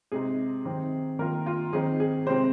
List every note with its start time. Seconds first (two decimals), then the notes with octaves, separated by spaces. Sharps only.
0.12 C3 G#3 D#4 G#4
0.65 D#3 C4 D#4
1.19 D#3 A#3 F4 A#4
1.46 F4
1.73 D#3 C4 D#4 G#4
2.00 G#4
2.26 C3 G#3 C4 C5